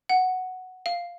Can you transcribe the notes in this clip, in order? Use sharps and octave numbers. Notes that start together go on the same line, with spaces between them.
F#5
F5